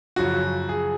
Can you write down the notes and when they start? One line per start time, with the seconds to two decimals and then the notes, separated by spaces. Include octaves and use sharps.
0.16 F#2 C#3 F3 F#4
0.69 G#4